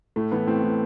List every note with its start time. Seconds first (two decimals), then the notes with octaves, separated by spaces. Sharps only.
0.16 A2 A3
0.32 E3 B3
0.47 A2 C4
0.63 A2